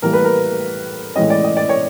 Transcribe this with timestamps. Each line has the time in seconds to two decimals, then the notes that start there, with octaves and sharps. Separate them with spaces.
0.02 A2 E3 G3 A#3 A#4
0.13 B4
0.24 A#4
1.16 A2 E3 G#3 C#4 D#5
1.30 D5
1.44 D#5
1.57 D5
1.69 C#5